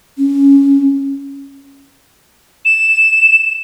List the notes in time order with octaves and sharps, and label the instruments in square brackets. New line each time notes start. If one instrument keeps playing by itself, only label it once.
[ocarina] C#4
[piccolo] E7